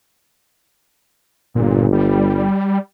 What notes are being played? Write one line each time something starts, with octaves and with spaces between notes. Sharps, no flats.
G1 A#2
G3